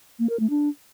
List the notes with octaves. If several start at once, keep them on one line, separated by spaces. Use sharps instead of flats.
A#3
A#4
A3
D4